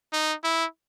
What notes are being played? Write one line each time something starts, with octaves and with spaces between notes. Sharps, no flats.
D#4
E4